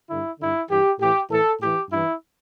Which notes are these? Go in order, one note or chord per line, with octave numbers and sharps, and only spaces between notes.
G2 D3 E4
G2 D3 E4
G2 E3 G4
A2 E3 G4
A2 E3 A4
A2 E3 G4
G2 E3 E4